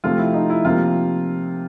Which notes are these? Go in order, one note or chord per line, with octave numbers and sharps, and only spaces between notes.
C3 F3 A3 C4 F4
E4
D#4
E4
C3 F3 A#3 F4